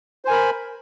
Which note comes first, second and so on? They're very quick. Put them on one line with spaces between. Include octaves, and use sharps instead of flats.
C5 G#5 A#4 B5